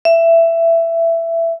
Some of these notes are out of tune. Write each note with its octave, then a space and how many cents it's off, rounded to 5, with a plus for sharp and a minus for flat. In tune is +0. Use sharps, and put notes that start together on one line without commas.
E5 +15